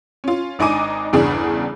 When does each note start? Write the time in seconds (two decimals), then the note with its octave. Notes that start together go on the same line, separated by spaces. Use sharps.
0.24 C#4 F4
0.59 G#1 D4 D#4 G#5 D6 D#7
1.13 G1 E2 C#3 D4 G#4